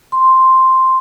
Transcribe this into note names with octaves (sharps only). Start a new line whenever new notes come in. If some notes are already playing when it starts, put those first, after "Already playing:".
C6